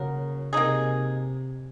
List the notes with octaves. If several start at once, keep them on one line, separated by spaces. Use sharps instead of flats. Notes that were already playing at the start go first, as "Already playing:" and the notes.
Already playing: C#3 F#3 A#3 A#4
C3 A#3 D#4 G#4